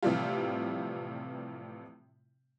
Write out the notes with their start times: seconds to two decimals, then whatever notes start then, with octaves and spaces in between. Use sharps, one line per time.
0.02 A2 C3 E3 F3 G3 F4